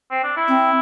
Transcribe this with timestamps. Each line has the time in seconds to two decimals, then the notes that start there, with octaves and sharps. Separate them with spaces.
0.11 C4
0.24 D4
0.36 E4
0.48 C4